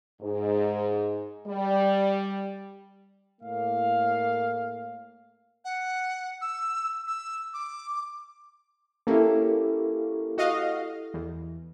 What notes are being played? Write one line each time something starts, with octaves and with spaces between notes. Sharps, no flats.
G#2
G3
A2 A#3 F5
F#5
E6
E6
D6
A#3 C#4 E4 G4 A4
F#4 D#5 F5
E2